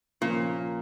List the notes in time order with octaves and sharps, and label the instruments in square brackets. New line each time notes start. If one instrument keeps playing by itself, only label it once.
[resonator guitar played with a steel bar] A#2 [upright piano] F3 A#3 C#4